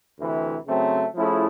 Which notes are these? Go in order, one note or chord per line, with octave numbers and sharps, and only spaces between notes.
D2 C3 E3
C#3 F#3 A3 C4
F3 A3 C#4 E4 G#4